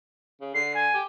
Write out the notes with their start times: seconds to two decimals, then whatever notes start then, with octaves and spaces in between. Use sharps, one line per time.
0.41 C#3
0.54 D3 C7
0.74 G#5
0.94 G4